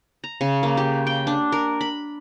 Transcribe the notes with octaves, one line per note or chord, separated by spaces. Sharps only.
A#5
C#3
A#3
G4
G5
D4
A#4
B5